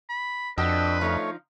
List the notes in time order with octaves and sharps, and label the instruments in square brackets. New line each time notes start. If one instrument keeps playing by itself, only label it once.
[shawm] B5
[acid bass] F2 [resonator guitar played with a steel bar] D4 F#4 [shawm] B4 [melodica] D#5 G5 E6
[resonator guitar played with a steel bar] F3 D#4 F5 [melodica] A3 C#5